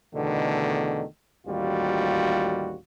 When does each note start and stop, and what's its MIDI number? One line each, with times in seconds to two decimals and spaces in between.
0.13 1.03 40
0.13 1.03 47
0.13 1.03 50
0.13 1.03 51
0.13 1.03 57
1.46 2.76 33
1.46 2.76 39
1.46 2.76 55
1.46 2.76 65
1.46 2.76 66